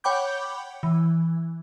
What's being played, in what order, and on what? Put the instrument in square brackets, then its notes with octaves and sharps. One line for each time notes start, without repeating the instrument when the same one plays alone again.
[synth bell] C#5 F#5 G5 B5 D6 G6
E3